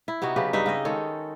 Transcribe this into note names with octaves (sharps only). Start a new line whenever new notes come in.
E4
C3 B3 D#4 F#4
C#3 F#3 G4 B4
G2 D#4 B4 E5
C#3 C4 D#5
D#3 G#3 A4 C#5